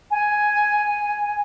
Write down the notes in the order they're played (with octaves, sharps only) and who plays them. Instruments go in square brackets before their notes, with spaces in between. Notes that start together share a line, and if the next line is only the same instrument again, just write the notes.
[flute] G#5